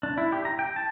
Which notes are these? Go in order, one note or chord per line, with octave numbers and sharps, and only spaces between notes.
D4
E4
G4
A#5
G5
A5